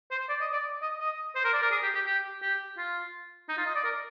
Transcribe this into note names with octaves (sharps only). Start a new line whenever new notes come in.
C5
D5
D#5
D5
D#5
D#5
C5
A#4
D5
A#4
G#4
G4
G4
G4
G4
F4
D#4
F4
D#5
D5
A#4